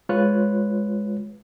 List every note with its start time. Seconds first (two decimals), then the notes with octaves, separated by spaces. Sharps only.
0.09 G#3 F4 B4 C#5 F#6